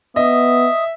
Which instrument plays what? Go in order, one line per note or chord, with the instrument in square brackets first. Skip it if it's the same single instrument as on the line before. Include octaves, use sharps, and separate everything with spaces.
[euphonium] B3 [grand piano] D#5 [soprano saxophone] E5 [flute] D#6